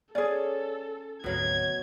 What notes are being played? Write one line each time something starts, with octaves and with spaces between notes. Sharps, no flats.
C#4 G#4 A4 D5
G#1 D2 B2 F#3 F5 G#6